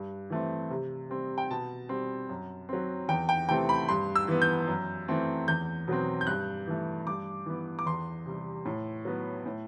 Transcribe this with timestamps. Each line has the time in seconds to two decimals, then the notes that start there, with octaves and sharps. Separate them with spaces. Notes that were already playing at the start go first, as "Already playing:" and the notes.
Already playing: G2
0.30 E3 A3 C4
0.70 C3
1.10 G3 C4
1.38 G5
1.51 B2 A5
1.89 G3 C4
2.29 F#2
2.69 F#3 C4
3.09 E2 G5
3.29 G5
3.49 C3 E3 A3 C4 G5
3.69 B5
3.88 G2 C6
4.16 E6
4.28 E3 B3
4.42 G6
4.68 F#2
5.08 E3 A3 C4
5.48 E2 G6
5.88 B2 F#3 C4
6.21 G6
6.27 G2 F#6
6.67 E3 A3
7.07 G2 D6
7.46 E3 B3
7.79 D6
7.86 E2 C6
8.26 C3 G3
8.65 A2
9.05 F#3 B3
9.46 A2